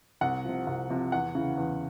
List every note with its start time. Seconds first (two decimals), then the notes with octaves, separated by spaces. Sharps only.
0.21 C2 F#5
0.45 C3 F3
0.67 C2
0.89 C3 F3
1.12 E2 F#5
1.35 C#3 E3
1.58 E2